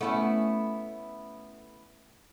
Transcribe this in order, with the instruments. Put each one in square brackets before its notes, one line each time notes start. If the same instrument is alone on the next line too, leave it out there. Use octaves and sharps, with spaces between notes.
[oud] A3 C#4 [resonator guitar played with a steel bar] B3 E4